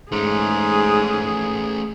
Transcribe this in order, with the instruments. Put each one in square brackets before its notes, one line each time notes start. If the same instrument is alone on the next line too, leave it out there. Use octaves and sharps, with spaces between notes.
[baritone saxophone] G#2 [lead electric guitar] A3 C#4 [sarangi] G#4